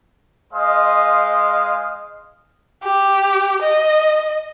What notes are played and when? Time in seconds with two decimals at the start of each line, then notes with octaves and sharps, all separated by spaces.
0.53 G#3 C5 D#5 F5 D#6
2.84 G4
3.62 D#5